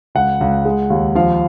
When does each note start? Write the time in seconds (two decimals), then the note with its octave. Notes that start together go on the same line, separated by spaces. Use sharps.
0.15 C#2 F#5
0.41 C#2
0.65 G#3
0.90 D#2
1.15 F3 F5